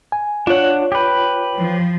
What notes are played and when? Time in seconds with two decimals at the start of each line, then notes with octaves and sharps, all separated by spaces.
0.12 G#5
0.47 D4 F4 C#5 F#5
0.92 G4 B4
1.57 F3